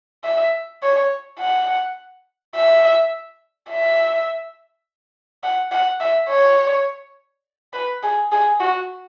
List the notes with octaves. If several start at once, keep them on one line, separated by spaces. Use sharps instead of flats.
E5
C#5
F#5
E5
E5
F#5
F#5
E5
C#5
B4
G#4
G#4
F#4